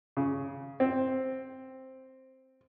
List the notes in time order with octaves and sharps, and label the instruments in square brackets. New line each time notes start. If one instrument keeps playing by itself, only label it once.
[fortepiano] C#3
C4